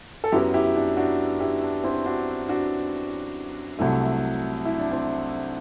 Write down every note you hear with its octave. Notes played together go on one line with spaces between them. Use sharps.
A4
F#2 F#3 B3 E4 G4
E4 G4
D4
D4 F#4
E4 G4
D4
C4 E4
D4 F#4
D4 F#4
C2 C3 F#3 A3
E4
D4
C4 E4